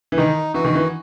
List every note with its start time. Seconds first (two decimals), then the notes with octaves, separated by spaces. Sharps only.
0.12 E3
0.18 D#3 D#4
0.54 E3 F#4
0.65 D#3
0.75 E3